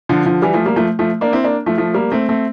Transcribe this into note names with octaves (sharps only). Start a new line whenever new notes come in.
D3 F3
D3 F3
E3 G3
F3 A3
G3 A#3
F3 A3
F3 A3
A#3 D4
C4 E4
A#3 D4
F3 A3
F3 A3
G3 A#3
A3 C4
A3 C4